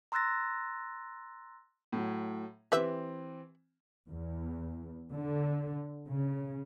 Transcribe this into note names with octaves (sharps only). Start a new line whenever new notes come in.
A#5 C6 E6 F#6 A6 A#6
A2 F#3
E3 C4 G4 B4 E5
E2
D3
C#3